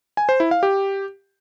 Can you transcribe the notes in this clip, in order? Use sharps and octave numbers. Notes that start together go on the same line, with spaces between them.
G#5
C5
E4
F5
G4